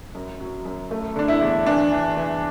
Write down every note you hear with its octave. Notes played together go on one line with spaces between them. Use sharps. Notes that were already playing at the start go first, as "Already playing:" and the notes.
F#2
F#3
F#2
A3
D3 D4
E4
E2
E3 D4
E3
E3